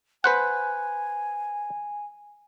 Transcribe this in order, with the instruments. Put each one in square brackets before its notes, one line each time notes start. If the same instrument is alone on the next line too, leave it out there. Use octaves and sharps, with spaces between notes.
[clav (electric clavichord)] B4 C5 F#5 [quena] G#5